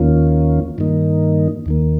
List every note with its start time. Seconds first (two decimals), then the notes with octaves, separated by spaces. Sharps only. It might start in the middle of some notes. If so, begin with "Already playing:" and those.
Already playing: D#2 D#3 A#3 C#4 F4
0.78 G2 D#3 A#3 D#4
1.66 D#2 D#3 A#3